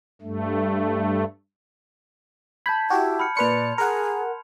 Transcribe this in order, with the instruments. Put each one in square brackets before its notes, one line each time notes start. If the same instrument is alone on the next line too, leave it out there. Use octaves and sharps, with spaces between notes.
[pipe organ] G2 A3
[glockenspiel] A5 G6 G#6 [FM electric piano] B5
[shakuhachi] E4 [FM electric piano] F#4 G4
[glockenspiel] B5 F6 C#7
[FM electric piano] A#2 B4 C#7 [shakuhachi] D5 [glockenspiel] C6 F7
[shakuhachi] G#4 [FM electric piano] A#4 F#5